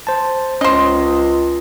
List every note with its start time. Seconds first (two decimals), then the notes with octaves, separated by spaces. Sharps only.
0.07 C5 A5
0.61 C#2 C#4 C5 D#5